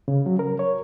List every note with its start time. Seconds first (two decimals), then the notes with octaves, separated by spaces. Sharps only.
0.08 C#3
0.26 F#3
0.39 A#4
0.59 C#5